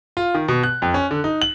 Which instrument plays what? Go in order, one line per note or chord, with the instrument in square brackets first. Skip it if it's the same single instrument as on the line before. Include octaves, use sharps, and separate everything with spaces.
[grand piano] F4
D#3
B2
F#6
F2
C#4
D3
D#4
F#7